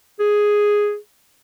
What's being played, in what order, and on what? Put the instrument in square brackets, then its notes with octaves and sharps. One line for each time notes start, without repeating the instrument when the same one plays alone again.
[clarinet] G#4